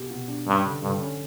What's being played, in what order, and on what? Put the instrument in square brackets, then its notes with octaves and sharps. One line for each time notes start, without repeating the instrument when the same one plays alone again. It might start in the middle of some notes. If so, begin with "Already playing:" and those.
Already playing: [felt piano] B2 G4
B2
D4
[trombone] G2 [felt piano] C#4
[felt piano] D3
[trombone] G2 [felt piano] D3
[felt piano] C#4